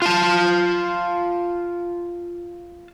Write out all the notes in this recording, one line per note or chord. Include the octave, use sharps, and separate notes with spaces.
F4 A5